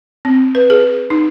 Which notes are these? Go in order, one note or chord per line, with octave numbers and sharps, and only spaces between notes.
C4
B4
G#4
D#4